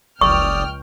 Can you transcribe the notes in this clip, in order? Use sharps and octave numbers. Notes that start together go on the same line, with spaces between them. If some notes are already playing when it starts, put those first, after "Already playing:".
F#1 C#2 D5 G5 C#6 D#6 F6